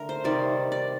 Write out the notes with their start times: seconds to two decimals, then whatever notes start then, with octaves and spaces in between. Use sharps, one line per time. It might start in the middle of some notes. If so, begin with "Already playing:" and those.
Already playing: D3 A3 A#4
0.09 C5
0.24 C3 D#3 G3 D5
0.72 D5